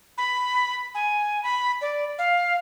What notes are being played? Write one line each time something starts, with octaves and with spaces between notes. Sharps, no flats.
B5
G#5
B5
D5
F5